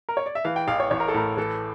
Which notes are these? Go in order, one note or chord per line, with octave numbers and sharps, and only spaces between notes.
A#4
C#5
D5
E5
E3 F5
G5
A1 F5
C#5
A1 C#5
A#4
A4
A2 A#4
E3 A4